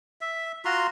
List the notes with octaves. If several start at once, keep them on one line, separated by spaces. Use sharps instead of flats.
E5
F4 F#4 A#5 C6